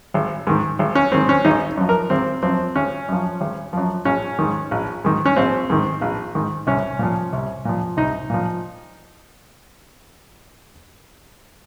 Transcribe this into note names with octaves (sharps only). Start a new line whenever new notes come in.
G#1
G#2 D#3
G#1
C#4
G#2 D#3 C4
C#4
G#1 D#4
F#2 F3
A#4
G#1 C4
F#2 F3 C4
G#1 C#4
F#2 F3
G#1
F#2 F3
A#1 C#4
G#2 D#3
A#1
G#2 D#3
C#4
A#1 C4
G#2 D#3
A#1
G#2 D#3
C2 C#4
A#2 F3
C2
A#2 F3
C2 D#4
A#2 F3